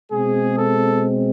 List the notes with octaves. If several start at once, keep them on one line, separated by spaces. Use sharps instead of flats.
B2 G#3 C4 G#4
A4